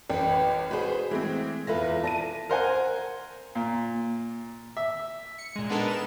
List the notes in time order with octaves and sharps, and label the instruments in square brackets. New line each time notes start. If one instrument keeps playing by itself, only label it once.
[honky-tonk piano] A1 [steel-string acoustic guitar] B4 G5
[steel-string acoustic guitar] F#4 G#4 [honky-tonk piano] B4 C5
[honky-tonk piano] E3 G#3 C4 [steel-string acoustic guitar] A3
[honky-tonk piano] E2 B4 A#6 [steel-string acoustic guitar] E3 F4 A4
[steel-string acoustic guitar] D5 [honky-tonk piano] A5 A#6 D#7
[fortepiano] A#4 C5 F#5 G#5
A#2
E5
[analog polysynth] C#7
A#2 G#3
G#3 B3 D4 D#4 A4 A#4
E7